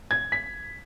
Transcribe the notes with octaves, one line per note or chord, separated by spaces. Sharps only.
G#6
B6